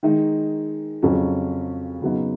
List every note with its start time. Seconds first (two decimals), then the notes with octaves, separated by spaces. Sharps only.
0.03 D#3 G#3 D#4
1.02 F2 C#3 F#3 C#4
2.02 C#3 F#3 B3 D#4